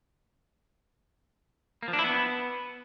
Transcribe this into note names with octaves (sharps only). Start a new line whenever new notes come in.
A#3
F3
D4
E4
B3